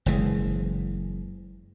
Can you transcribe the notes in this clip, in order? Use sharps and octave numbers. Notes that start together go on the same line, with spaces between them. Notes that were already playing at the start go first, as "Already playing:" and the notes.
F#1 E3 G#3